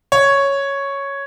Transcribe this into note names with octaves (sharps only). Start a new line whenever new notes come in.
C#5